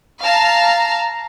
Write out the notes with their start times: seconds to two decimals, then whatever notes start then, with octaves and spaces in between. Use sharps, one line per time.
0.22 F5 A5 A#5